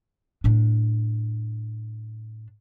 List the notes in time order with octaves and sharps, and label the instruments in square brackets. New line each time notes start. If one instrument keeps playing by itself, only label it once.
[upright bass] A2 D4